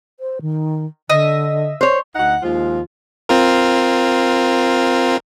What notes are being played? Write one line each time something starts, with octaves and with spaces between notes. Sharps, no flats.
C5
D#3
D3 D#5 E5
C5 C#5
D2 D#4 F#5
D#2 F3 G#3 F4
C4 F4 A#4